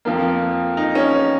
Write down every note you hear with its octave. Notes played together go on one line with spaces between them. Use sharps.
F2 F3 A#3
D#4
C#4